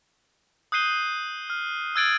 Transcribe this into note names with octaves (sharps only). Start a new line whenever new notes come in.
D#6 F#6 G6 C7 D#7 G7
F6
E6 F#6 G#6 A6 D7 F#7